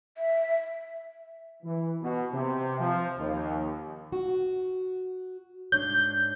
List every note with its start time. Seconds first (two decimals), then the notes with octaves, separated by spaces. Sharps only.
0.18 E5
1.63 E3
2.01 B2
2.33 C3
2.77 F3
3.17 D#2
4.12 F#4
5.72 G#2 D4 C#5 G6